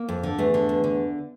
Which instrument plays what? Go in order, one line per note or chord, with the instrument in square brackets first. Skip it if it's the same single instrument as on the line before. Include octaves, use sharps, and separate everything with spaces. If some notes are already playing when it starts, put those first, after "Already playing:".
Already playing: [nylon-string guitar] A#3
F2
D3
E2 A3
D3
E2
D3